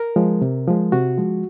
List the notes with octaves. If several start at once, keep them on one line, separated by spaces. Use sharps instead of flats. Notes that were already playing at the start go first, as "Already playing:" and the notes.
Already playing: A#4
F3 G#3
C3
F3 G#3
C3 F#4
F3 G#3